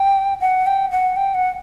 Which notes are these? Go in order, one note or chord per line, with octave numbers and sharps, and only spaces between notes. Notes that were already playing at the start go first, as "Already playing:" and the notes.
Already playing: G5
F#5
G5
F#5
G5
F#5